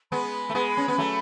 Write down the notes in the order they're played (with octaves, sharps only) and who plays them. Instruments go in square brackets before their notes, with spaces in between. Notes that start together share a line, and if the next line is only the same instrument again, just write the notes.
[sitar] G#3 B3 [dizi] B5
[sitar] A3
G#3 B3
C#4
B3
F#3 A3